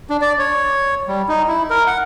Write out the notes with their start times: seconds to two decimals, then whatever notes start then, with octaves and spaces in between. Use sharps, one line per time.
0.10 D4
0.21 D5
0.39 C#5
1.08 G3
1.29 D#4
1.48 E4
1.70 A#4
1.87 F#5